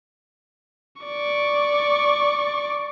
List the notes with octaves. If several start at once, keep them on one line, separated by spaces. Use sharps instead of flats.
D5 C#6